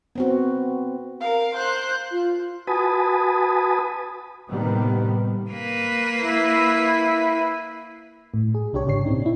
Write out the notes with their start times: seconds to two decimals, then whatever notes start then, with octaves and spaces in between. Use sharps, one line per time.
0.15 B3 C4 F#4
1.21 A#4 F5
1.55 C5 F#6
2.11 F4
2.67 F#4 B4 G#5 A5 B5 D#6
4.48 A2 C3 D#3 G3 A#3 B3
5.51 A#3 B4
6.22 E4
8.34 A2
8.55 G#4
8.73 C2 D4 G4 C#5
8.86 G#1 C#3 D4 C#5 C7
9.06 A#2 C4 D#4
9.22 D4 E4